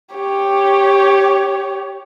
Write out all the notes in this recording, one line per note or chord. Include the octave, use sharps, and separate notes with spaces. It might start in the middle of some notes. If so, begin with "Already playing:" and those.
G4 C#5